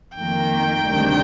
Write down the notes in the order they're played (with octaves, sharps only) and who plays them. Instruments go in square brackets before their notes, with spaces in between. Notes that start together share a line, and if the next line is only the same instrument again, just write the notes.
[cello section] F2 D#3 A#3 [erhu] G5
[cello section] D2 C3 D#3 G3 D4